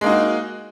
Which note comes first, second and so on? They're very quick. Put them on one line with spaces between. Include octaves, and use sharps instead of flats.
G#3 A#3 D#4 F#4